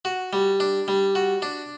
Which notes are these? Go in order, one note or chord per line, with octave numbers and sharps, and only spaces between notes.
F#4
G3
D4
G3
F#4
D4